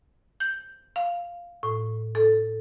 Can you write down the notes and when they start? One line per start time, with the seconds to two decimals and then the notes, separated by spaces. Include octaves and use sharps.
0.40 G6
0.96 F5
1.63 A2
2.15 A4